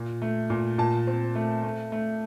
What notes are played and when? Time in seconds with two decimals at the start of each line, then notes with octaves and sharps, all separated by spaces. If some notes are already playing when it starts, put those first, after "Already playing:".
Already playing: A#2
0.22 A3
0.50 A#2
0.78 A#2 A5
1.07 C4
1.35 A3
1.63 A3
1.92 A3